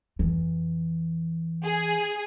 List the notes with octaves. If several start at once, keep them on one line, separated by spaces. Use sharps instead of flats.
F2 E3
G#4